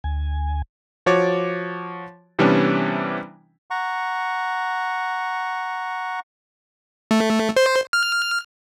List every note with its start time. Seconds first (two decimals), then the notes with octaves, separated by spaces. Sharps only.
0.04 D2 G#5
1.06 F3 F#4 C#5 D6 A6
2.39 C3 E3 G3 B3 C#4 D4
3.71 F#5 A#5 C#6
7.11 A3
7.56 C5
7.93 F6